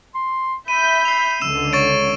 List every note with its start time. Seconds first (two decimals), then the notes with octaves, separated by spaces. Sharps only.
0.14 C6
0.68 E5 B5 G6 D#7
1.05 C7 F7
1.41 C#2 D3 E6 E7
1.73 C#5 C#6 A6 D7